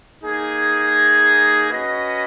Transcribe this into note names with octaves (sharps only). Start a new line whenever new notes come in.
A#3 D#4 G#4
C#4 F#4 B4 D#5